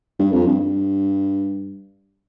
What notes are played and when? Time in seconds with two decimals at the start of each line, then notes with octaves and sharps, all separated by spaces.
0.19 G2
0.32 F2
0.46 G2
0.60 G2